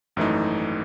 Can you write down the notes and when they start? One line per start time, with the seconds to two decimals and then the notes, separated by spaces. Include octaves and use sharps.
0.16 G#1 F#2 E3 A3 D#4